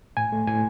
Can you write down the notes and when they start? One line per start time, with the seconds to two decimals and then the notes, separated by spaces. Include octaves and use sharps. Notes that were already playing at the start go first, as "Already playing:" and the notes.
0.17 A2 G#5
0.32 A3
0.47 A2 G#5